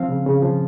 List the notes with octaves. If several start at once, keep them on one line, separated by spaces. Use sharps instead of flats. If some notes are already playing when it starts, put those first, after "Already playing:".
Already playing: F3 C4 F5
C#3
C#3
F3